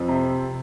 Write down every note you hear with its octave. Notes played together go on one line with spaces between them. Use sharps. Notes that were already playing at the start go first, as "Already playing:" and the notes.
Already playing: F2
C3